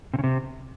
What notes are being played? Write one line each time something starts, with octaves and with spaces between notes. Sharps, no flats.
C3
C#3
C3